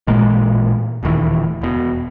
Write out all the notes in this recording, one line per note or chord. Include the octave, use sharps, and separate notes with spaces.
A1 A#2 G#3 A#3
D#1 D2 D#3 E3
E1 B2